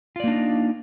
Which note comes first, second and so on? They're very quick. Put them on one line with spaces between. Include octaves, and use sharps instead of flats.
F4 D5 A#3 D4 D#4